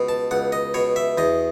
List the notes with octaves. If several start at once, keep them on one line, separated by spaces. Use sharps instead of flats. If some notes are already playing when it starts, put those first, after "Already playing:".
Already playing: C#2 B2
A5
C#2 F#5
D#5
B2 C#5
E5
E2 D#5